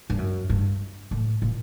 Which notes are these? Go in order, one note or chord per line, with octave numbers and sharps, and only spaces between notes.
G2
F#2
G2
A2
A#2